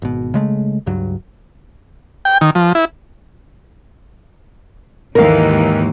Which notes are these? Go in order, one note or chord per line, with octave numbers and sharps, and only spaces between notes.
G#1 B2
C#3 G#3 A3
C#2 G2 F#3
G5
D#3
F3
E4
D#2 G#2 E3 A#4 F5